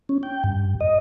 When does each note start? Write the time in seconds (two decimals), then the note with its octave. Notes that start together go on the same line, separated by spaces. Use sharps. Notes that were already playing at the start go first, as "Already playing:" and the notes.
0.09 C#4
0.23 G5
0.44 G2
0.81 D#5